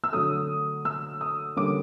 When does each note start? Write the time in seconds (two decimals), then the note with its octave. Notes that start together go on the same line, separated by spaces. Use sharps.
0.04 E6
0.12 D3 F#3 A3 D#6
0.85 E6
1.21 D#6
1.56 D3 G3 A#3 C#4 D6